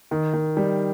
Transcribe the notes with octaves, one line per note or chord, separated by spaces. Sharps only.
D#3
D#3
G3